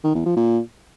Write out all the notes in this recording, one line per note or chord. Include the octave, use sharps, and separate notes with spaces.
D#3
E2
F3
A#2